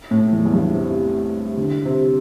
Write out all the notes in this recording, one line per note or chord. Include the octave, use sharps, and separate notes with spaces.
A2
E2
E2
G2
C3
D3
C3